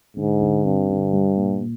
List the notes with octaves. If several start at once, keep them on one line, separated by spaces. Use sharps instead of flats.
G#2 D3
D3
G2 C4
D3
G3
A#2
A#2